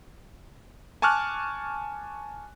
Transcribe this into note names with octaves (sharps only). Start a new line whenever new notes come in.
G#5 A5 C#6 D6 F6 F#6